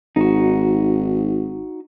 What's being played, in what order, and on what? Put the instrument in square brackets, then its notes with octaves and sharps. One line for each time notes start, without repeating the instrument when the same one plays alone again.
[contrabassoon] G#1 [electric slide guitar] D#4 F#4